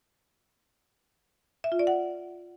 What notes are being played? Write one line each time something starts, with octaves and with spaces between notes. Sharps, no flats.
E5
F4
D5
F#5